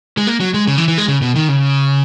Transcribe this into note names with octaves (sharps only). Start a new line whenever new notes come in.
G#3
A#3
F#3
G#3
C#3
E3
E3
G#3
C#3
B2
D#3
C#3